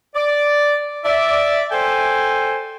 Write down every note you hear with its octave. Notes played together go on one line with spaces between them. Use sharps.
D5
D5 E5
A4 C5 G5 G#5